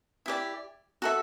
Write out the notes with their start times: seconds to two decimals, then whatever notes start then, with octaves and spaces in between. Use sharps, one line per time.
0.26 E4 G4 D5
1.02 F#4 A4 E5